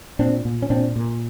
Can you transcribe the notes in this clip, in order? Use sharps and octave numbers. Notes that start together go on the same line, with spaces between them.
A#2 C4 D4
A#2
C#4
A#2 C4 D4
A#2